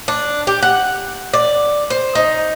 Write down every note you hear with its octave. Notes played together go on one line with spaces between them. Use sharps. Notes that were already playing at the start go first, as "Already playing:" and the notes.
D4
G4
F#5
D5
C5
D#4